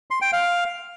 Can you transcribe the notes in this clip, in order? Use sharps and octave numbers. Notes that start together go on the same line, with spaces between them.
C6
G5
F5